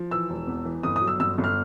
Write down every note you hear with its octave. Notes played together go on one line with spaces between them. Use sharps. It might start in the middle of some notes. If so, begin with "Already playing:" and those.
Already playing: F3
E3 E6
E1
E2
E3
G1 D#6
D#6
F#3
E6
G1 E6
G1
F6